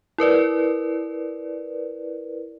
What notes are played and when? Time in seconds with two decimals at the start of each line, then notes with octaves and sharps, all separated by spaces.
0.18 E4 A#4 B4 D5